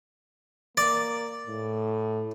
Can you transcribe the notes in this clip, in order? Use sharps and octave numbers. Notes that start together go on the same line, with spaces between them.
A#3 D5
A2